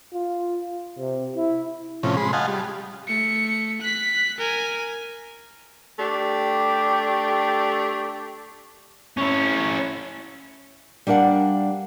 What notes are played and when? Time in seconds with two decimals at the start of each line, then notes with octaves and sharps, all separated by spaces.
0.13 F4
0.98 C3
1.36 E4
2.03 A2 C3 F3 C#4
2.17 G#3 B5 C6
2.33 D#5 F5 F#5 G#5 A5
2.48 G3
3.07 A3 C#7
3.82 F#6 B6
4.38 A#4 G#5
6.00 A3 D4 G4
9.17 C#4 E4
11.07 G3 D4 A#4 F5 F#5